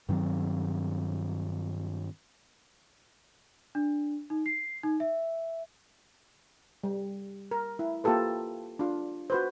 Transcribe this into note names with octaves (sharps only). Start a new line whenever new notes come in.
G2 D#3 F#3 C4
D4
D#4
C7
D#4
E5
G3
A#4
E4
A#3 F4 G4 A4 B4
D4 F4
F#4 B4 C5